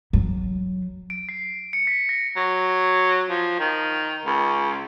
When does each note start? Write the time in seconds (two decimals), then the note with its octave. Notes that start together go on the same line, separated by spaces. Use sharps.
0.13 F#3
1.10 D7
1.29 C7
1.73 C#7
1.87 B6
2.09 A#6
2.37 F#3
3.29 F3
3.60 D#3
4.26 C#2